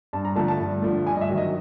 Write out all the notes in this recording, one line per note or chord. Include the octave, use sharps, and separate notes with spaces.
G2 A5
A#5
D3 F3 A3 A5
A5
G2
D3 F3 A3
G2 G#5
D#5
E5
D#3 F#3
D#5